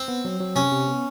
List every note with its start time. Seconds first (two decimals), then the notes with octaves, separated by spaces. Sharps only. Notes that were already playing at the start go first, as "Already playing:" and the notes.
Already playing: C4
0.08 B3
0.25 F#3
0.40 F#3
0.56 C3 C#4
0.71 C3
0.87 B3